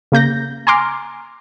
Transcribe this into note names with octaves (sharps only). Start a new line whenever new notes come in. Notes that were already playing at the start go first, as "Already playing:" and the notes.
C#3 A#3 G6 A#6
G#5 A#5 C6 D6 F6